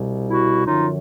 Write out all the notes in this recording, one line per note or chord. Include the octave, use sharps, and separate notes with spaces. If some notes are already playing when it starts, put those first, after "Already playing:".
Already playing: C2 B2 G3
E4 F#4
F#2 D3 F3 D#4 F4